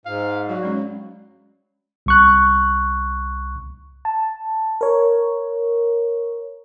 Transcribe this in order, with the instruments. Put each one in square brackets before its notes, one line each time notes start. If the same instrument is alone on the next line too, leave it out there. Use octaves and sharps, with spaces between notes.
[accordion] G#2 [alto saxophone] F5
[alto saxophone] F#3 [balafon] D5 F5
[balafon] G#3 C#4
[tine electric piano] C2 C#6 F#6
[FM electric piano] A5
A#4 C#5